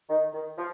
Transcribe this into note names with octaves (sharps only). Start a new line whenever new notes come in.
D#3
D#3
F3